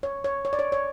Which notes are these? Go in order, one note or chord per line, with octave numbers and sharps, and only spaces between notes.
C#5
C#5
C#5
D5
C#5
C#5